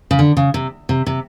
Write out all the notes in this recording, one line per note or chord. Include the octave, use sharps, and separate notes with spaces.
C#3
D3
C#3
C3
C3
C3